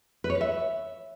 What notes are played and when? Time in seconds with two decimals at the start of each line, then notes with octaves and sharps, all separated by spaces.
0.24 B4
0.30 C#5
0.35 B4
0.41 E5